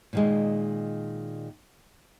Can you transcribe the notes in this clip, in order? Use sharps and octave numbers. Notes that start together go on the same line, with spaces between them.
A#2 D#3 G#3